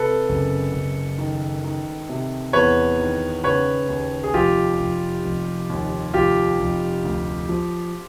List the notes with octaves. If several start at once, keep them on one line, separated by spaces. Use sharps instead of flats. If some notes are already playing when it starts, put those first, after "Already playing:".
Already playing: C3 A4 B4
F#1
F#1
D#3
D#3
C3
E2 B4 C#5
D#3
C#3 B4 C#5
D#2
G#4
F1 F4 G4
F1
F1
D#2
F1 F4 G4
F1
D2
F3